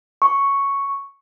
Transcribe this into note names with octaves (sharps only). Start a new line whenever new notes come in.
C#6